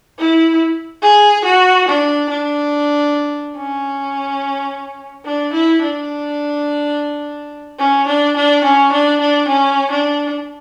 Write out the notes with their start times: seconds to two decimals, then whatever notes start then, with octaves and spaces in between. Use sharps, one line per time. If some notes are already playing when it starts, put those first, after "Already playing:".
0.19 E4
1.02 G#4
1.45 F#4
1.88 D4
2.29 D4
3.57 C#4
5.25 D4
5.53 E4
5.82 D4
7.79 C#4
8.07 D4
8.36 D4
8.64 C#4
8.92 D4
9.21 D4
9.48 C#4
9.91 D4